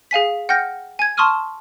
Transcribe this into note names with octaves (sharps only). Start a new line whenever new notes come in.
G#4 F5 G#5 B6
F#5 G5 F6 G6 A#6 C#7
G#5 G#6
A5 C6 C#6 D#6 F6 D#7